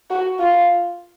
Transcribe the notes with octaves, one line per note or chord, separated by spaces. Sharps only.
F#4
F4